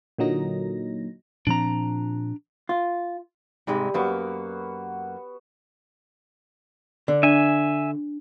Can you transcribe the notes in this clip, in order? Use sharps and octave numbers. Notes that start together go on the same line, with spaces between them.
A#2 D3 F#3 D#4 A#6
A#2 F3 C4 D4 A#5
F4
G#2 C3 G3 G#3
F#2 A#3 B3 F#4 C#5
D3
D4 E5 G#5